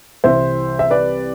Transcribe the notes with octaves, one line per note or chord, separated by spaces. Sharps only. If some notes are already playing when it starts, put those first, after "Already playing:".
C2 C3 E3 C5 E5
E5
B4 D5